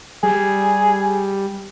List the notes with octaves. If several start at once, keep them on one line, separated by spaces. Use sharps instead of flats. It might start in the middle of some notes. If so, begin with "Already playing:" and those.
G3 G#4